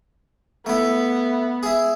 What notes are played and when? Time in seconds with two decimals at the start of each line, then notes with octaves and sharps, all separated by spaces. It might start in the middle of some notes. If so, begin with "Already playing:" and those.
0.66 A3 B3 E4
1.63 E4 G#4